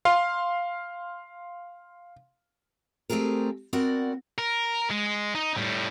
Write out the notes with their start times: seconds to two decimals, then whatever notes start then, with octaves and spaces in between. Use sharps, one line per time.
0.05 F5 C6
3.10 A3 C4 G4 G#4 A#4
3.73 B3 C4 F#4 A#4 D5 F#5
4.38 A#4
4.91 G#3
5.35 D#4
5.58 A2 G3